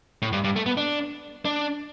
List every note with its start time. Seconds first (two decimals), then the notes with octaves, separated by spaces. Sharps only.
0.22 A2
0.33 G2
0.44 G2
0.56 A3
0.66 B3
0.77 D4
1.45 D4